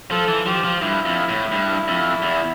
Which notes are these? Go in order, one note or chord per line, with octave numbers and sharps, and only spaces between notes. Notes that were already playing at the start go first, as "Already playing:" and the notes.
F3 A4
E3
F3 G4
F3
G2 E4
F2
A2
G2
F2
E2